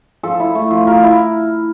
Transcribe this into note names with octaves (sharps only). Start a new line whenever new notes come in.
F3 A4
E4
A3
F3
F3 A#4
E4